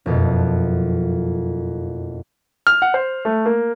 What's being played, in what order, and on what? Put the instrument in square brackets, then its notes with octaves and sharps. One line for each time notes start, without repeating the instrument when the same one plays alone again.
[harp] F#1 F2 B2
[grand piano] F6
F#5
C5
A3
A#3